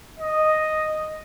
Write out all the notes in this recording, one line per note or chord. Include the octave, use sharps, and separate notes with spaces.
D#5